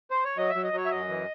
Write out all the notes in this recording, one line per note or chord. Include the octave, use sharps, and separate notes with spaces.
C5
C#5
F#3 D#5
E5
F#3
D#5
F#3 C#5
E5
F#2 D#5
E3